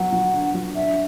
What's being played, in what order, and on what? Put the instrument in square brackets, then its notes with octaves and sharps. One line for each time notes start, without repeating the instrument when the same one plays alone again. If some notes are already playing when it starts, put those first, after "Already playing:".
Already playing: [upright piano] F#3 B3 [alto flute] F#5
[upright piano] F#3
D3
F#3
[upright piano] D4 [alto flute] E5